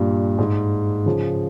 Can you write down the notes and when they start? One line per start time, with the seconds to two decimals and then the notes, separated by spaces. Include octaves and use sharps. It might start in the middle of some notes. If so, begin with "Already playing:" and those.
Already playing: G2 A#2
0.38 G#2
1.06 C#3 F3